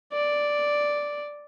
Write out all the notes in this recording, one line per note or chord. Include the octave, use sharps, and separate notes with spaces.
D5